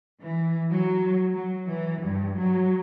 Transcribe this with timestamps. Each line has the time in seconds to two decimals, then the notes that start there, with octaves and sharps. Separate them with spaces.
0.21 E3
0.70 F#3
1.32 F#3
1.68 E3
2.03 G2
2.38 F#3